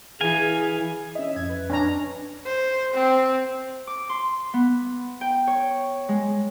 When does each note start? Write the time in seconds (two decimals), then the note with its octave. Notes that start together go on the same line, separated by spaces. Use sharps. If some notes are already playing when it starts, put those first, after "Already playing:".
0.21 E3 G#4 F5 G#5
1.15 C#4 D#5 E5
1.36 F2 G#6
1.50 B4
1.70 C#4 D4 A#5
2.46 C5
2.94 C4
3.87 D6
4.09 C6
4.54 B3
5.21 G5
5.47 C#5
6.09 G#3